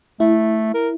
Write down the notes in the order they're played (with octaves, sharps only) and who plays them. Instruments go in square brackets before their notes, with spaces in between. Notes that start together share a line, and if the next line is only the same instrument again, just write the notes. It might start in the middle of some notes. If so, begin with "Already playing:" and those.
[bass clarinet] A3 [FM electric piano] E4
[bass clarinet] A#4